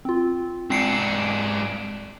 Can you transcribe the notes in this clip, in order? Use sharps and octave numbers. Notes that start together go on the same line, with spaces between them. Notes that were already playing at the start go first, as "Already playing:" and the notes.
C4 F4
G#2 C4 D4 C7 C#7